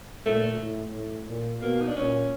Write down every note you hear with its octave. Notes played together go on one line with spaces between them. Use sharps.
A#2 A3
A2
A2
A#2
B2 A#3
D#4
D4
A#2 C#4